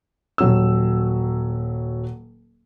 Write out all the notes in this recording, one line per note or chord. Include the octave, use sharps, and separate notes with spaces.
D#1 F#3 E6